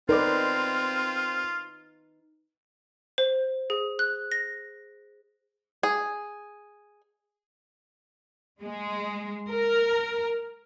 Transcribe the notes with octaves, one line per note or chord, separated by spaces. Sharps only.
C4 D#4 F4 A#4 B4 D5 D6
C5
G#4
F#6
A#6
G#4
G#3
A#4